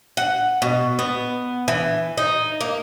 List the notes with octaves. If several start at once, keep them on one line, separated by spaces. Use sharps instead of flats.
F#5
B2
B3
E3
D#4
A#3